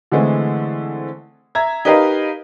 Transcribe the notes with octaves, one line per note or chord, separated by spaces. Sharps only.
D3 E3 G#3 A3 C4
E5 A#5 G#6
D#4 G4 A#4 B4 D#5 F5